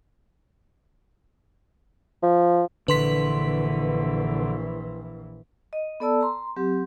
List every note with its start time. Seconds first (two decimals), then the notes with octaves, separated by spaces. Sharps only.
2.23 F3
2.88 A#1 D3 E3 B4 C6 B6
5.73 D#5
6.00 B3 A4 D5 A5 E6
6.21 A#5 C6
6.56 F#3 C4 G4